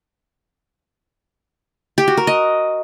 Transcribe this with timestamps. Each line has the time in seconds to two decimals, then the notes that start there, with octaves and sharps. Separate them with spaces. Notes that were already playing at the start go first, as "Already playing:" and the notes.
1.98 G4
2.08 F#4
2.17 A#4
2.27 D#5